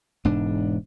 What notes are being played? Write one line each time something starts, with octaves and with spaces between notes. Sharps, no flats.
E1 G#2 D4